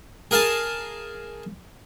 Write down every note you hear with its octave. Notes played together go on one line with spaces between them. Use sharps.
G#4 A#4 F5 G#5 A5